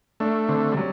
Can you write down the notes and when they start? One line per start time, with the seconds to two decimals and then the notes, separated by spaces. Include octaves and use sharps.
0.20 A3 D4
0.49 D3 C4
0.72 G3
0.77 F#3